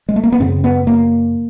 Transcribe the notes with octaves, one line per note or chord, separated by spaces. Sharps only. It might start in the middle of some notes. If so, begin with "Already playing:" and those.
G#3
A3
A#3
B3
F#2 C#3 C4
B3
A#3